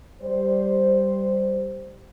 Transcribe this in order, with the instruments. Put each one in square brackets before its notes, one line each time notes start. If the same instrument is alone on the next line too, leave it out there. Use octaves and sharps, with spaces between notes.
[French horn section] G3 C5